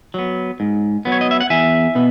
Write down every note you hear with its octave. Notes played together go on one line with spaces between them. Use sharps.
F#3 B3
G#2
F#3 B3
C#5
D#5
E5
F#5
E2 E5 G#5
B2 B3